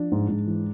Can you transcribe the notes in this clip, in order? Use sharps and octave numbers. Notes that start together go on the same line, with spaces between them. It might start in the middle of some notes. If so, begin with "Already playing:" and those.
Already playing: F3 D4
G#2
G#2
E3